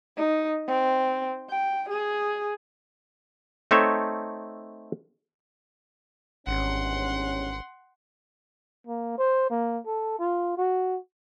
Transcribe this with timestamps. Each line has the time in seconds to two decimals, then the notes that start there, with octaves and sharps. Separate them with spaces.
0.17 D#4
0.68 C4
1.50 G5
1.89 G#4
3.71 A3 C4 D#4 A4 C#5 E5
6.47 G#1 E2 G2 C#4 F#5 C6
8.87 A#3
9.19 C5
9.51 A#3
9.86 A4
10.19 F4
10.58 F#4